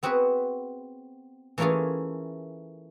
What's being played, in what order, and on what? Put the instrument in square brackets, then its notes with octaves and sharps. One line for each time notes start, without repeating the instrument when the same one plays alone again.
[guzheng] B3 C4 F#4 G#4 B4
E3 A3 A#3 C#4 F4 G#4